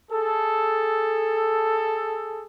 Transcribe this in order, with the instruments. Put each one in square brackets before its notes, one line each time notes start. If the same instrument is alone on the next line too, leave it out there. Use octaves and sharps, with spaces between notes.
[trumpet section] G#4 A4